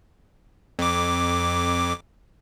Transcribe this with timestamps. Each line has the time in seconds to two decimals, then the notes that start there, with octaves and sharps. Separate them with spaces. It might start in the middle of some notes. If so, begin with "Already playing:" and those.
0.79 F2 D6